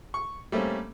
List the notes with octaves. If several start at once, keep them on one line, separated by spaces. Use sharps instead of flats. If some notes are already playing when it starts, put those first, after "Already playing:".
C#6
G3 A3 A#3 C4 C#4